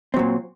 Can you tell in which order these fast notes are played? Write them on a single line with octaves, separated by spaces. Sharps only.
C4 F#3 A#2